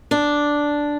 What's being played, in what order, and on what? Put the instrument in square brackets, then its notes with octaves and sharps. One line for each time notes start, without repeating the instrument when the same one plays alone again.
[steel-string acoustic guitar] D4